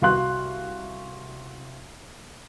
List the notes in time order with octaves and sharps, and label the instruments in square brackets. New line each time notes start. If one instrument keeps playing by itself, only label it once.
[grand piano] C2 F#4 F5 C6 F#6